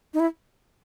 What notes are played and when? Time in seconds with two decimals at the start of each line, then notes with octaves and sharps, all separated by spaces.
0.14 D#4
0.20 E4